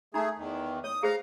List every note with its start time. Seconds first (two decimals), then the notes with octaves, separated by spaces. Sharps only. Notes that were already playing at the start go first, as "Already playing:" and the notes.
0.14 A3 D#4 G#4 A#5
0.37 E2 D#3
0.84 C#5 D#6
1.03 G#4 C5 F5 A#5